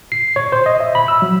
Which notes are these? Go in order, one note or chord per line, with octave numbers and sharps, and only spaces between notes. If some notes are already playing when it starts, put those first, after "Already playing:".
C7
C#5
C5
D#5
E5
B5
E6
F#3